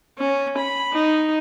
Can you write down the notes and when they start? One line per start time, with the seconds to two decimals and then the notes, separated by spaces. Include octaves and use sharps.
0.18 C#4
0.59 B5
0.93 D#4